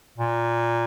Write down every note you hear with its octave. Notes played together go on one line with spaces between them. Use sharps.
A#2